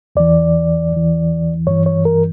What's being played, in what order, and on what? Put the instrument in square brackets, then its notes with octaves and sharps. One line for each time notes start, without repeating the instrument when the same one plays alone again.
[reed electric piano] E2 E3 D5
E2 E3
G2 E3 C#5
C#5
A#4